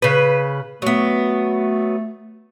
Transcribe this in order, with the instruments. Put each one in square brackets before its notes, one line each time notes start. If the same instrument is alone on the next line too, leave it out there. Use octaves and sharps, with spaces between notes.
[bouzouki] C#3 B4
[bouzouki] F#3 B3 [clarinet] A3